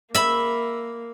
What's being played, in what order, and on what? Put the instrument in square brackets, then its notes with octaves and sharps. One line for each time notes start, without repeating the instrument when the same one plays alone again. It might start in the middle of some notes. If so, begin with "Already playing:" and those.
[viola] A#3 [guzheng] E5 B5